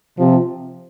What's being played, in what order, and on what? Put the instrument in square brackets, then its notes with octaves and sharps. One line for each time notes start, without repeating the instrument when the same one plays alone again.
[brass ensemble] C3 [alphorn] F3